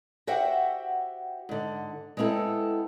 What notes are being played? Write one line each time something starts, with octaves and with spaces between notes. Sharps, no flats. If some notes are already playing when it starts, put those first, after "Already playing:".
F#4 G4 C5 E5 F#5 G5
G#2 D3
G#3 B3 C4 E4 A4